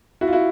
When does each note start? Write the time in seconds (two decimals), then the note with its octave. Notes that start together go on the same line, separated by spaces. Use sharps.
0.21 E4 F#4
0.28 F4
0.33 E4 F#4